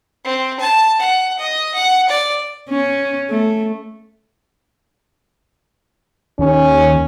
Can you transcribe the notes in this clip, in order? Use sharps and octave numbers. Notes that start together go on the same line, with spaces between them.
C4
A5
F#5
D#5
F#5
D5
C#4
A3
D#2 C#4